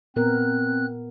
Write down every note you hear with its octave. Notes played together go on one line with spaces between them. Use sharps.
A#2 B3 C4 A#4 F#6